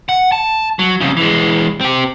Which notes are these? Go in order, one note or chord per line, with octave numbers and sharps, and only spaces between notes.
F#5
A5
F#3
F2 C#3
E3 G#3
C4 G4